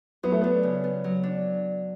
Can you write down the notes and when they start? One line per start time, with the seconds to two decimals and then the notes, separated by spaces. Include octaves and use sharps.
0.23 F#3 B3
0.32 A3
0.41 B3 D4
0.63 C#3
0.84 B3
1.04 F#3
1.23 D4